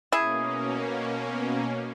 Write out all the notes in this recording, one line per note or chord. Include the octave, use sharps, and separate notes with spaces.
B2 A#3 C#4 E4 G#4